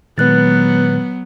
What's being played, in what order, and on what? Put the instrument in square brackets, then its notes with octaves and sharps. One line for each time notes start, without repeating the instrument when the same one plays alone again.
[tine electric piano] A#2 D#3 G#3 [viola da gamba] F#3 B3 [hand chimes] B4 F#6 A6